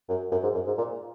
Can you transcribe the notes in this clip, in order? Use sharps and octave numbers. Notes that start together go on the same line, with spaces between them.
F#2
F#2
G#2
F#2
G#2
A#2